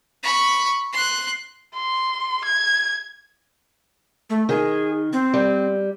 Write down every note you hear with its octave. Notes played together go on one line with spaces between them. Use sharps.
B5 C#6
C6 F#6
C6
G#6
A3
D#3 G#4
C4
G3